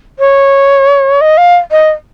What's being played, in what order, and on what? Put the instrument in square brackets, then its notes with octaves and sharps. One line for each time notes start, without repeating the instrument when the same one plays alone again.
[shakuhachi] C#5
D#5
F5
D#5